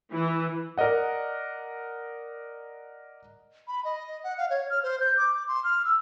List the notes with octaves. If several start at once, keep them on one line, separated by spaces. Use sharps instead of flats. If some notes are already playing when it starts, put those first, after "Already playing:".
E3
A#4 D5 D#5 F#5
B5
D#5
F#5
F5
C#5
F6
C5
G6
D6
C6
F6
E6